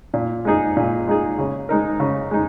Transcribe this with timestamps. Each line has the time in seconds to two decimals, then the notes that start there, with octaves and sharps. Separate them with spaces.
0.14 A#2
0.45 G#3 D#4 G#4
0.77 A#2
1.07 G#3 D#4 G#4
1.39 C#3
1.69 G#3 D#4 A#4
2.00 C#3
2.31 G#3 D#4